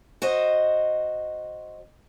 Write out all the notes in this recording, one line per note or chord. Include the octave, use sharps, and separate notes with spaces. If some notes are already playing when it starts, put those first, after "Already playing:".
F#4 C5 D#5